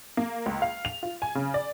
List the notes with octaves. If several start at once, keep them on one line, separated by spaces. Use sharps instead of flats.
A#3
C#2
F5
F7
F4
G#5
C#3
D5